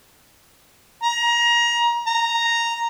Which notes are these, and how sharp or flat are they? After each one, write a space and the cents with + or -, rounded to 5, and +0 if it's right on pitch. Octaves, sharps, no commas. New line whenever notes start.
A#5 +25
A#5 -5